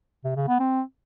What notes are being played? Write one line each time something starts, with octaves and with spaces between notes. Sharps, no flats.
C3
C#3
B3
C4